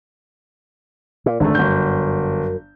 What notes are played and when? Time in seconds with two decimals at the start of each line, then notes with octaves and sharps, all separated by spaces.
1.26 A#2
1.40 G#1 F#2 D3 A3
1.55 G1 F#2 G6